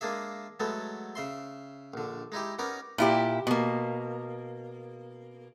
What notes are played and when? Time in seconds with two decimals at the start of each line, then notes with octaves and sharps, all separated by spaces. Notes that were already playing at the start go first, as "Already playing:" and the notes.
0.01 G#3 A#3 D4 G#4 E5
0.60 F#3 G#3 A3 B3 A4
1.15 C#3 E5 C6
1.94 A#1 D3
2.32 G#3 D#4 E4 G4
2.59 B3 C#4 D#4 A#4 D6
2.98 A#2 E4 G4
3.47 B2 A#3